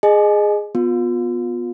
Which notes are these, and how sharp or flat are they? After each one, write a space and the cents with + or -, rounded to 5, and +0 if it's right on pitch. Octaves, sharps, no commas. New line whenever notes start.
G#4 +0 D#5 -20 G#5 +30
B3 +0 F4 +30